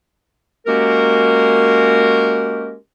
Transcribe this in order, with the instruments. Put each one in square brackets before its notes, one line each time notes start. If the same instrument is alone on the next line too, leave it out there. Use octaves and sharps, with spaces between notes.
[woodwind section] G#3 A#3 C#4 F#4 G4 A#4